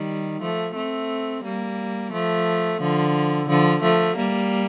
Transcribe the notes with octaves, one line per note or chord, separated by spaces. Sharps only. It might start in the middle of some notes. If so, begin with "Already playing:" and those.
Already playing: D#3 G3
F3 A3
A3 C4
G3 A#3
F3 A3
D3 F3
D3 F3
F3 A3
G3 A#3